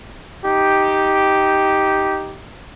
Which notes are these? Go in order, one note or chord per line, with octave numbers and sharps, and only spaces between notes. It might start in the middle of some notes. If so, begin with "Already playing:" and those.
D#4 G4